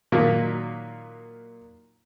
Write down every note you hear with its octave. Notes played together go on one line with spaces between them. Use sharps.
A#2 D#3 F#3 A#3